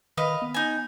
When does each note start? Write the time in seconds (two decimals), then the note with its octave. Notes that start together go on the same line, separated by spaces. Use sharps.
0.17 D#3 B4 D#5 F5
0.42 B3
0.54 D#4 G#5